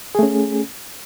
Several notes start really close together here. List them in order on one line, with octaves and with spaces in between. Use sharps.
G#4 A3 C#4